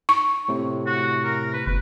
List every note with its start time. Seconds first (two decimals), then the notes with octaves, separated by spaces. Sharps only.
0.09 C#6
0.48 A2 C3
0.86 F#4
1.24 A#4
1.53 B4
1.67 G1 B4